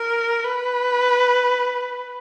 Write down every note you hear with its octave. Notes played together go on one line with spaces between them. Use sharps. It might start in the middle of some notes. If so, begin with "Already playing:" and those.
Already playing: A#4
B4